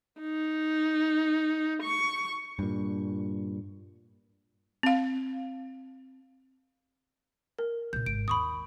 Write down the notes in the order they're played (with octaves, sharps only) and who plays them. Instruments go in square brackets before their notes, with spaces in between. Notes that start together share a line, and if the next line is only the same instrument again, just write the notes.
[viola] D#4
C#6
[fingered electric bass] G2 A#2
[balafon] C4 F5
[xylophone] A#4
[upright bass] A#2 C4 [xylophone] G6
[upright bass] G#1 [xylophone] D7
[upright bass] D#2 [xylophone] B5 C#6 D#6